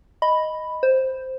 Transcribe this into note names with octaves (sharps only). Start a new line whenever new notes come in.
D#5 B5
C5